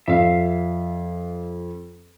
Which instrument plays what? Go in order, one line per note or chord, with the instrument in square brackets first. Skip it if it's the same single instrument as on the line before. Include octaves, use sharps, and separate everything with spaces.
[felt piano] F2 [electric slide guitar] E5 F5